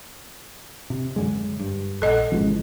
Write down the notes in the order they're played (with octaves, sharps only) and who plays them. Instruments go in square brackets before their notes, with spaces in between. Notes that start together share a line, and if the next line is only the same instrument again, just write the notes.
[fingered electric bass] C3
F#2 D3 G#3
G2
[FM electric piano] A#1 F#5 [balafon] A4 D#5
[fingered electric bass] G#1 F3 [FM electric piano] C#3 E3 G#3